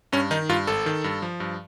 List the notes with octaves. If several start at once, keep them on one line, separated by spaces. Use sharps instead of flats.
G2 C#4
D#3 D#4
G2 F4
G#1 A4
D#3
G2
F3
G2